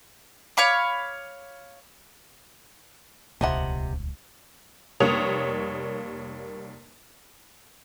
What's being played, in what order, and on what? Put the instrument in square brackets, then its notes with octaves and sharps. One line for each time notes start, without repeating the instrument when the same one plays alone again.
[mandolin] C#5 F5 B5 D6
[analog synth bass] D#1 [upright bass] C#2 [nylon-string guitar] C3 D#5 F#5 [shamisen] F3 E4
[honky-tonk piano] F1 G3 A#3 C#5 D#6 F7